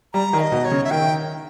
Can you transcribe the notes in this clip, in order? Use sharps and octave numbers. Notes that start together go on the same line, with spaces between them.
G3 A#5
D#3
D#5
B2
C#5
C#3
E5
D#3 G5